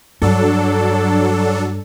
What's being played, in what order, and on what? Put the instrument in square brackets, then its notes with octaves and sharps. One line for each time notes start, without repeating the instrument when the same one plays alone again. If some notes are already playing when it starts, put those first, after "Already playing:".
[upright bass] G2 [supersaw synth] F#3 D4 A4